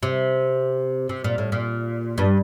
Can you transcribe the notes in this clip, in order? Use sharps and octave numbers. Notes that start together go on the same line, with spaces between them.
C3
C3
A#2
A2
A#2
G2